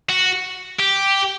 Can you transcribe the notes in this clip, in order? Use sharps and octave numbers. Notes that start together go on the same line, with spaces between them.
F#4
G4